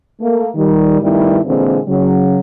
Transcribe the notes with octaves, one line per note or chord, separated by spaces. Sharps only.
A3 A#3
D#3 G3
G2 D#3 G3 A3 B3 E4
A#2 D3 E3 G#3 A#3 C4
C#3 F#3